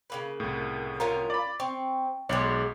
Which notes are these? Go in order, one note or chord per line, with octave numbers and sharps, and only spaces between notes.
C#3 A#3 B4
C2 A2
C#4 F4 A#4
D5 B5
C4 C#6
B1 G#3 B3 C#5 D5